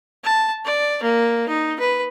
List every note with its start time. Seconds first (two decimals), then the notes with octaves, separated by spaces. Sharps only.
0.24 A5
0.65 D5
1.03 A#3
1.48 D#4
1.80 B4